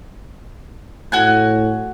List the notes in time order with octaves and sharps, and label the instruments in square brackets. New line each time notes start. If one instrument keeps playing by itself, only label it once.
[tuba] A2 [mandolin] F#4 G#5 F#6